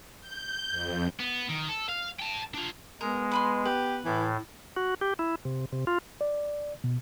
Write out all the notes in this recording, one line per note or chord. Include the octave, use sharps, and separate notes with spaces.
G6
F2
B3
D#3
A4
F5
G5 A5
D4 F4
G#3 B3 A#4
B4 B5 C6
G4 B4
A2 E3
F#4
G4
E4
C3
C3
F4
D5
B2